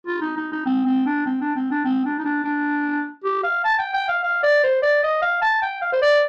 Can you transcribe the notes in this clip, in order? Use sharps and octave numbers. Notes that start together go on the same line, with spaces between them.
F4
D#4
D#4
D#4
C4
C4
D4
C4
D4
C4
D4
C4
D4
D#4
D4
D4
G4
F5
A5
G5
G5
F5
F5
D5
C5
D5
D#5
F5
A5
G5
F5
C5
D5